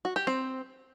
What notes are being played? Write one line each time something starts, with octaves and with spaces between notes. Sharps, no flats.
F#4
G4
C4